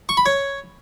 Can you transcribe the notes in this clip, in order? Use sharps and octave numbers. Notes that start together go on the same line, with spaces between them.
C#6
B5
C#5